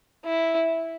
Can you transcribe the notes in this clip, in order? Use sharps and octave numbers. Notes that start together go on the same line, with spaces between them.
E4